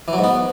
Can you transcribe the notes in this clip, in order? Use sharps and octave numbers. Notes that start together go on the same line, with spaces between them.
E3
F#3
G#2
B3